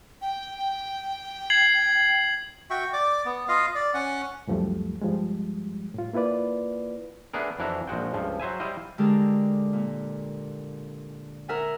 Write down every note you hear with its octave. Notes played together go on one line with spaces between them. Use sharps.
G5
G#6 C7 F#7
F#4 E5 G5 C#6
D5 D6
B3
F4 D#5 F5
D5
C#4 F#5
C#2 F#2 F3 G3 A3
G2 F3 G3 G#3
A2 F4
A#3 E4 F4 B4 D5
A3 B3 D4 G#4 A#4
F2 E3 D4 E4 F#4 A#5
A#1 F3 G#3 F#4 G5
C#2 G2 F3
F#3 C5 E5 G#5
G3 E4 C5 D#5 F5
D3 G#3 G4 A#4 A5
A#2
A#4 E5 F#5 G#5